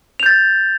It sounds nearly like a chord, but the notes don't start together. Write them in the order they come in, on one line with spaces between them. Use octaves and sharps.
F7 G6 A6